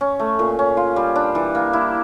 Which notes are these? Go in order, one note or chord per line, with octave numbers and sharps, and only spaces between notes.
C#4
A3
A#2
C#4
F4
G3
D4
E3
A#3
E4